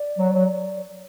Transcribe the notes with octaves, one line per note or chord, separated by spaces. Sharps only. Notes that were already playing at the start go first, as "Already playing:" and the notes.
Already playing: D5
F#3
F#3